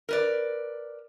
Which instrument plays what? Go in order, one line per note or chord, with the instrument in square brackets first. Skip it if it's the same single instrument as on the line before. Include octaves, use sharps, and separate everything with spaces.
[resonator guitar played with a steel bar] A#4 B4 D5